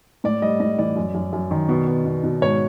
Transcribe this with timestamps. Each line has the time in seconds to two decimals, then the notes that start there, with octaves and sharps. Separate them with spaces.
0.24 A2 D5
0.42 G3 D#5
0.60 A2 D#5
0.78 E3 D5
0.96 F#2
1.15 F#2
1.33 F#2
1.51 D#3
1.69 B2
1.87 B2
2.06 B2
2.24 B2
2.42 G#2 C#5